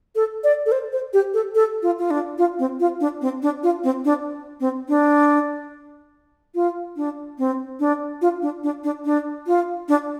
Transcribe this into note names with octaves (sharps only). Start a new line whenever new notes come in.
A4
D5
A4
C5
C5
G4
A4
A4
F4
F4
D4
F4
C4
F4
D4
C4
D4
F4
C4
D4
C4
D4
F4
D4
C4
D4
F4
D4
D4
D4
D4
F4
D4